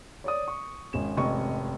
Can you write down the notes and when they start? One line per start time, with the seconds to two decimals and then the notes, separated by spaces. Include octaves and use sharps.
0.24 C#5 D5 D#6
0.48 C#6
0.93 G#1 C#4 E7
1.17 F1 D#5 C#6